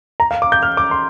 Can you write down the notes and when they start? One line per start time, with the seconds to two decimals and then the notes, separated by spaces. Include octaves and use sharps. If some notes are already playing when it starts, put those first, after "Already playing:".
0.20 A#5
0.31 F5
0.42 D6
0.52 G6
0.63 F6
0.77 D6
0.91 C6